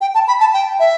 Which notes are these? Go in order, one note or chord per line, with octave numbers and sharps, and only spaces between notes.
G5
A5
B5
A5
G5
E5